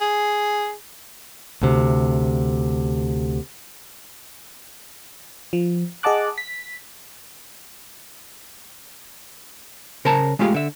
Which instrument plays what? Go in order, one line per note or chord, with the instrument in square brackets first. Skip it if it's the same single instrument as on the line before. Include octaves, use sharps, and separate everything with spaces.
[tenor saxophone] G#4
[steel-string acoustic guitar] D2 C3
[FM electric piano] F3
G#4 D#5 F#5 A5 D6 F#6
B6
[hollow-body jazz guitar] C#3 A#4 C5 C#5 A5 A#5
G#3 A3 F4 G4 G#4 F5
D3 E5